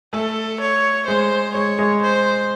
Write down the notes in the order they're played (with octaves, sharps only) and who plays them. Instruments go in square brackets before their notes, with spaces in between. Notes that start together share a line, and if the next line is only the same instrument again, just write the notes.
[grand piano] A3 [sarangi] A4
[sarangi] C#5
[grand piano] G#3 [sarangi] C5
[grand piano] G#3 [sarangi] C#5
[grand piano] G#3
[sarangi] C5